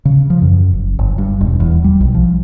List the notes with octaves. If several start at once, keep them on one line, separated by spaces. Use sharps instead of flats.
C#3
F3
F#2
F#1
G1
G2
E1
E2
G3
B1
F3